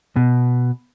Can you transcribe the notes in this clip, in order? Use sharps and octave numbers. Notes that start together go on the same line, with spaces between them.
B2